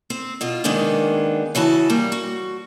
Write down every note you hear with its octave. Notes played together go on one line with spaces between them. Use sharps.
C4
B2 F4
C3 D#3 G#3 A#3 B3 D4
C#3 E3 F#4 A5
G3 A#3
F#4